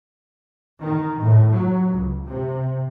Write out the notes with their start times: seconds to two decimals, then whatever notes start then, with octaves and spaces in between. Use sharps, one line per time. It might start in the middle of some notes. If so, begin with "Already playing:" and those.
0.81 D#3
1.19 A2
1.53 F#3
1.93 C#2
2.25 C3